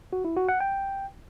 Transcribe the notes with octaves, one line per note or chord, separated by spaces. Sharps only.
F#4
E4
F#4
F#5
G5